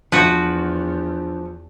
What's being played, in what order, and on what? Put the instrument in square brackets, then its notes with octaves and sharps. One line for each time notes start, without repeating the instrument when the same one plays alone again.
[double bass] E2 [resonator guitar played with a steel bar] F3 [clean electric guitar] D4 E5 [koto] F#4 B4